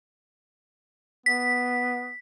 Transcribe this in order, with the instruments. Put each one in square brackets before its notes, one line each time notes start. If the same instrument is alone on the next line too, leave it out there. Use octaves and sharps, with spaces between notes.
[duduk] B3 [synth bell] B6